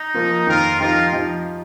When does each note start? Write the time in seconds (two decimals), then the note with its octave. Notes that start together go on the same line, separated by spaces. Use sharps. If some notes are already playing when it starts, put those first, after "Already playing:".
Already playing: D#4
0.15 F3 A#3 F4
0.47 F2 D#3 C4 F4 A#4
0.80 F3 D#4 F4 G4 A#4
1.12 F3 D#4 G4